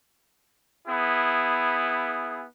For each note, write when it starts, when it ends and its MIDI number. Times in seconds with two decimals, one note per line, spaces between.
0.88 2.46 59
0.88 2.46 64
0.88 2.46 68